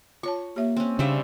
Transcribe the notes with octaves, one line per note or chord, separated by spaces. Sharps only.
F4 C#5 A5 C#6
A#3 G4 C#5 E5
C4 C#4
C#3 G3 D4 C5 D5 E5 F5